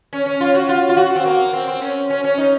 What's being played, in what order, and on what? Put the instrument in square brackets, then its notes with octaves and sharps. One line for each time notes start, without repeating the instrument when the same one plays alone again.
[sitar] C#4
C#4
F4
F#4
F4
F4
F#4
C4
A#3
C4
C4
C#4
C#4
C#4
D#4